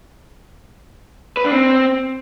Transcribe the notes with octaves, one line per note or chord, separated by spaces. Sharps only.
B4
D4
C4